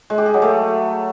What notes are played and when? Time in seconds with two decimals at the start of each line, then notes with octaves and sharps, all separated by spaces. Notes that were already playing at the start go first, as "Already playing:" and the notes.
0.10 G#3
0.18 G4
0.26 G#4
0.34 F#3
0.42 A3